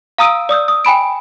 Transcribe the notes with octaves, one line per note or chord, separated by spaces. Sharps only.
F5 A#5 D#6 E6 D7 D#7
D5 D#6 E6 G6
D#6
G5 G#5 B5 D7